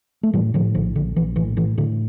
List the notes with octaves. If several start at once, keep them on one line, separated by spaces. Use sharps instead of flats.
A3
A2 E3 G3
A2 D3 F3
A#1 D3 F3
A#1 D3
A#1 E3
A2 E3
A2 E3
A2 D3